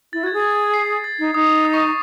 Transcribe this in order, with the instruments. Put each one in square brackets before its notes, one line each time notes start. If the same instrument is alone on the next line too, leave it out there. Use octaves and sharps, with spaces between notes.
[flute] E4 [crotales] A6
[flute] F#4 [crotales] G#6
[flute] G#4
[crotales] A6
C7
A6
[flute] D#4
[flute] D#4 [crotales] D#6
[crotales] D#6
C#6